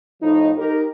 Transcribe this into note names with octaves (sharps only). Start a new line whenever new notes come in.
A2 F3 D#4
D#4 G4 A#4